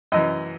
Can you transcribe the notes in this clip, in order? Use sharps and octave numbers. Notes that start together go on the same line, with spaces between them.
F#2 E3 D#5